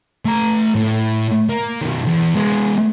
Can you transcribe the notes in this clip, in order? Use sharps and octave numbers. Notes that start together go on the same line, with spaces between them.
A3 A#5
A2
A#3
B2 D#3
E2
G#3 B3